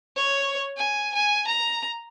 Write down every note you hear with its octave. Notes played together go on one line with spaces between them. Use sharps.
C#5
G#5
G#5
A#5